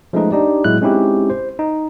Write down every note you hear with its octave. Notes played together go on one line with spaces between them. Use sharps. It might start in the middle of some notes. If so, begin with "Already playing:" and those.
F3 G#3 A3 C#4 D#4 B4
D4 D#4 G4 D5
A2 F#3 G#3 B3 E4 F#6
G#3 C4 C#4 D#4 E4 G4
C5
D#4